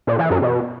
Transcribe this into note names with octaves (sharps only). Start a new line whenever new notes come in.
A#2
E3
F#2
B2